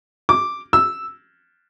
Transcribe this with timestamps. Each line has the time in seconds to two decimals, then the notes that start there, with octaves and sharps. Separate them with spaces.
0.29 D6
0.73 E6